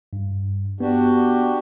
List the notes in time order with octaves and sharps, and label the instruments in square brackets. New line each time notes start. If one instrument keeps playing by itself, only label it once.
[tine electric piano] G2
[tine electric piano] B3 [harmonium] D4 F#4 G4